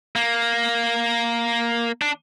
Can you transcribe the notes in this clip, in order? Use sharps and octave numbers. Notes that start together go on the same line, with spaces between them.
A#3
D4